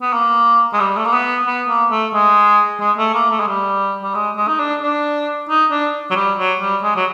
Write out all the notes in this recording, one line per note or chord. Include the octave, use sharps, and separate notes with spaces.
B3
A#3
G#3
G3
A3
A#3
B3
B3
A#3
A3
G#3
G#3
A3
A#3
A3
G#3
G3
G3
G#3
G#3
D#4
D4
D4
D#4
D4
F#3
G3
F#3
G3
G#3
F#3